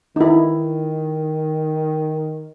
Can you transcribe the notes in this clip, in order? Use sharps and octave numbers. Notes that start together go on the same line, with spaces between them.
D#3 D#4 E4